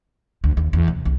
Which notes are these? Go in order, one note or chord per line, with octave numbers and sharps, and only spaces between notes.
D2
D#2
E2
C3
C2